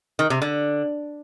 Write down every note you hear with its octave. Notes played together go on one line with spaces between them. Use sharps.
D#3
C3
D3